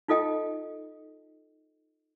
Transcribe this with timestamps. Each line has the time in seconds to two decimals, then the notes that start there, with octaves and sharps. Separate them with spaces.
0.08 D#4 F4 A4 D#5 G5